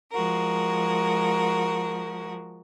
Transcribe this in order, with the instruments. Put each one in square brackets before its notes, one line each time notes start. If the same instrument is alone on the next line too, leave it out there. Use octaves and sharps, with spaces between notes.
[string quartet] F3 G#3 F#4 A#4